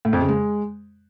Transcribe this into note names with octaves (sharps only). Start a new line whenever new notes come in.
A2
F2
C#3
G#3